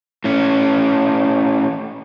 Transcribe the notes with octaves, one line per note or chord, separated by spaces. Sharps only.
A2 C#4